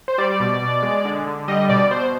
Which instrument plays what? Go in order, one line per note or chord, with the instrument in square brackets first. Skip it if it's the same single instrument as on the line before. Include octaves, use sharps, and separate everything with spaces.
[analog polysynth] C5
G3 D5
B2
B2
G#3
D3
D3
G3 D#5
B2 D5
B2 C5